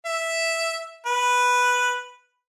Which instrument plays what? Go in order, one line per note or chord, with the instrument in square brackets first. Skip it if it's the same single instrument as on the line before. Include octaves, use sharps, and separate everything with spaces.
[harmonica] E5
B4